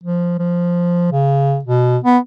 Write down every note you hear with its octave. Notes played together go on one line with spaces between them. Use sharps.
F3
F3
C#3
B2
B3